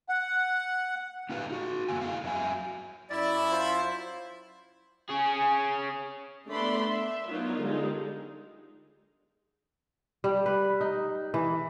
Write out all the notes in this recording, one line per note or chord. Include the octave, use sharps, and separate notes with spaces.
F#5
A#3 D#4 F4 G4 B4 F5
D#4 F#4
F#2 D3 F3 A#3 B3 G#5
E4 G#4 F5
F#3 E5 G#5
F#2 E4 D5
F4 C5
C#4 G#4
A3 B3 D4 D5 B5 C6
E5
F#3 B3 D4 D#4 F4 A#4
D3 G3 G#3 D#4
G3
B4
D#4
E3